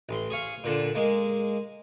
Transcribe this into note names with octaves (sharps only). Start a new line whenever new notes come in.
A1 C6
G#4 C#5 F5
A#2 D3 D4
G#3 A#3